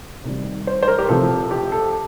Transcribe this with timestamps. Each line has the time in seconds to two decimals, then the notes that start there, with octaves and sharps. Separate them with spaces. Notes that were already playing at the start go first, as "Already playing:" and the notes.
0.24 C3 D#3 G3
0.67 C5
0.83 C5
0.88 A#4
0.98 G4
1.09 C3 F3 A4
1.51 G4
1.72 A4